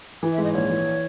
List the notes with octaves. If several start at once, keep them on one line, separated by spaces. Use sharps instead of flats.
E3
E5
G#2
D#5
A#1 C#5
E3